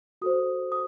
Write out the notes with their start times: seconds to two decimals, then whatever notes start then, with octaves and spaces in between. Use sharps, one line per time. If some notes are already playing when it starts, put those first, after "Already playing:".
0.22 F#4 A4 C5 D#6
0.72 D#6